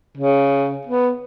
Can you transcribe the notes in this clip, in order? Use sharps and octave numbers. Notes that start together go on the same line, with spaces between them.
C#3
B3